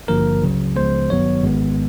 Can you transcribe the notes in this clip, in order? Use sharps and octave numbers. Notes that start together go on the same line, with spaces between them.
G#1 G2 D3 F3 A#3 A#4
C#2 C#3 F#3
C#2 C#3 F3 G#3 B3 C5
G#1 G2 D#3 F#3 B3 C#5
G#1 G#2 D#3 G#3 B3